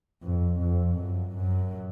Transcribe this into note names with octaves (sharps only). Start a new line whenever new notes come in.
F2
F2
F#2
F#2